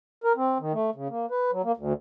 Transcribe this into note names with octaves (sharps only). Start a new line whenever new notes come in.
A#4
C4
D#3
A3
C#3
A#3
B4
F#3
A#3
D2